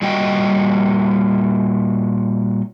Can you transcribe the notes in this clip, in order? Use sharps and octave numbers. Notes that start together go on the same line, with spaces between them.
A#2 G3 F#4 D#5 G5